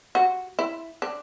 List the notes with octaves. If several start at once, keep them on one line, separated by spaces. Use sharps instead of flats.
F#4
E4
D4